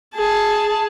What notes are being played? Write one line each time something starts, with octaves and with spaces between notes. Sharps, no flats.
G#4 A5